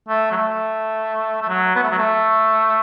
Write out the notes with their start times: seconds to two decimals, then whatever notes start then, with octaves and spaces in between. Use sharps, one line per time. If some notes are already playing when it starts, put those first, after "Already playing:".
0.09 A3
0.32 F#3
0.36 A3
1.42 A3
1.49 F#3
1.76 B3
1.83 A3
1.91 F#3
1.99 A3